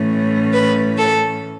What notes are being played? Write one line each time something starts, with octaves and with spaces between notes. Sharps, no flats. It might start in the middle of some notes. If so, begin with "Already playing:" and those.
Already playing: A2 E3 A3 C#4
B4
A4